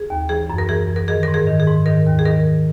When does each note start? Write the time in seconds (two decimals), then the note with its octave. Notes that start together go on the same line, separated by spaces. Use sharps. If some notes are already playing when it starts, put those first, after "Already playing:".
Already playing: G#4
0.10 D#2
0.29 E3 G#4
0.50 F#2
0.58 A#4
0.69 E3 G#4
0.88 F#2
0.96 A#4
1.08 D#3 G#4
1.23 G#2 A#4
1.34 G#4
1.47 D#3
1.60 G#4
1.67 G#2
1.86 D#3 A#4
2.06 D#2
2.19 G#4
2.25 D#3 A#4